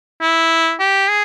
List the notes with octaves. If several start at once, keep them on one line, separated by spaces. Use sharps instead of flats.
E4
G4
G#4